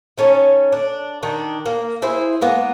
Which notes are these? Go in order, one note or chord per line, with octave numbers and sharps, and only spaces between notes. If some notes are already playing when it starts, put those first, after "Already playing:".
D#3 C#4 A4 C#5
D4
D#3 D4
A#3
E4 G#4 C5
G#3 A#3 B3